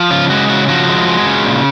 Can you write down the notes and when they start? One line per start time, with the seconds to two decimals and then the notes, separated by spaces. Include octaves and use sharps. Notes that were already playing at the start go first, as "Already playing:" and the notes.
Already playing: F3
0.11 C#3 F4
0.30 G#3 F#4
0.49 C#3 F#4
0.69 F3 F#4
0.88 G#3
1.08 G#3
1.26 C#3
1.46 A#2